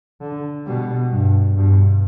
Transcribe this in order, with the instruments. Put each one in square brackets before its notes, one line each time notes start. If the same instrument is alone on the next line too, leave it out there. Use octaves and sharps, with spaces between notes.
[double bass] D3
[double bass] B2 [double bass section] G3
[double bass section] G2
[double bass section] G2 [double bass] B2